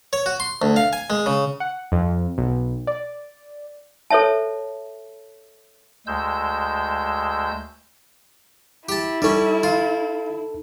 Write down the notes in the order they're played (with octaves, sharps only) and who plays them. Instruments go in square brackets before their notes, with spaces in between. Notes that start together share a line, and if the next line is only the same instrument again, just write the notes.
[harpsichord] C#5
F#4
C6
D2
F5
G#5
G#3
C#3
[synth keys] F#5
F2
B1
D5
[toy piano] A4 C5 C#5 E5 A5
[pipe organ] D2 G#3 E6 G6
[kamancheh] E4 [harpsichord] G4 A5
[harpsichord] G3 C#4 [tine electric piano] D#4 A4
[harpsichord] F4